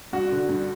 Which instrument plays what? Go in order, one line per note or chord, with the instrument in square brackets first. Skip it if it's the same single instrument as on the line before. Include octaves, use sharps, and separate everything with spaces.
[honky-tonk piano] G2 [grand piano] F#4
[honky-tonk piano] D3
G2